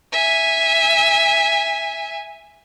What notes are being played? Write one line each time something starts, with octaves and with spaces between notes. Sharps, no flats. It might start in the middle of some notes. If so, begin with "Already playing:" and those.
E5 G#5